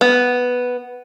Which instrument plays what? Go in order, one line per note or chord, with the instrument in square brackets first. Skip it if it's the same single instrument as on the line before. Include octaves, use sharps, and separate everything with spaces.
[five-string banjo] B3